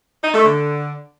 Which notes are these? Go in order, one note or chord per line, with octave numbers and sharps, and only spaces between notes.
D#4
A3
D3